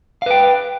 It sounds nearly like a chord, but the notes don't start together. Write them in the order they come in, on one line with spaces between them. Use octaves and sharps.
F5 B4 G5